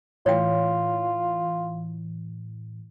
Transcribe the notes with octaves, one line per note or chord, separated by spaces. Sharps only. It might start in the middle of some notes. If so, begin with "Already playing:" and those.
A2 E3 F4 C#5 G5